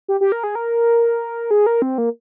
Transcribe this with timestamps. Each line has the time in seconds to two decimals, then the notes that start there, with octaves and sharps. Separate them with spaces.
0.08 G4
0.21 G4
0.32 A#4
0.43 G#4
0.55 A#4
1.51 G#4
1.66 A#4
1.82 C4
1.98 A#3